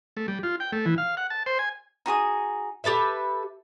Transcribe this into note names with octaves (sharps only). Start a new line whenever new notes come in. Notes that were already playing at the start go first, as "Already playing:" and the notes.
A3
G3
F4
G5
A3
E3
F5
F#5
A5
C5
G#5
D#4 F#4 G#4 D#6
G4 A4 B4 E5